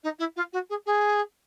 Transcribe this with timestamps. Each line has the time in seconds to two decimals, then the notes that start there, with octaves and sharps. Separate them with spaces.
0.03 D#4
0.19 E4
0.36 F4
0.52 F#4
0.69 G#4
0.86 G#4